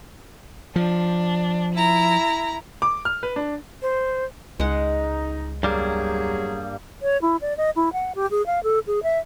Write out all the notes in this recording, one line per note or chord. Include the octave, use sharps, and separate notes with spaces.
F3 D4
E4 A#5
D6
F6
B4
D4
C5
C#2 G#3 D#4 F#5
E2 G2 F#3 G3 A#3 G#4
C#5
E4
D5
D#5
E4
F#5
G4
G#4
F5
A4
G#4
E5